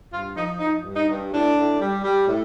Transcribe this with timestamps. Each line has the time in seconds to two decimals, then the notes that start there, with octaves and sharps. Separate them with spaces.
0.12 G2 F4
0.36 F3 D#4
0.60 F3 D#4
0.84 G2
0.96 D#4
1.09 G2
1.32 A2 D4
1.56 A2
1.80 G3
2.04 G3
2.28 A2